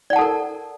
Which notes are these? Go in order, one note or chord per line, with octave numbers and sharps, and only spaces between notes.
A4 A#4 D5 F#5 A5